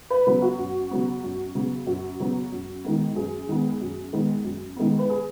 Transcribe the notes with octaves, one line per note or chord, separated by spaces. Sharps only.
B4
C#3 F#3 B3 B4
F#4
F#2
C#3 F#3 B3
F#2
C#3 F#3 B3
F#2 F#4
C#3 F#3 B3
F#2
D#3 G#3 B3
F#2 G#4
D#3 G#3 B3
F#2
D#3 G#3 B3
F#2
D#3 G#3 B3
B4
G#4